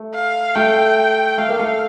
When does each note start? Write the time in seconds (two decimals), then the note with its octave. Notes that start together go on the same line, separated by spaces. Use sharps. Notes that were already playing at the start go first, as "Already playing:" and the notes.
Already playing: A3
0.15 F5
0.55 A3 G5
1.38 A3 F5
1.49 A#3
1.59 A3